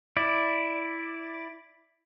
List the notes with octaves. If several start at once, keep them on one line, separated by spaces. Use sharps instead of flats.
E4 D5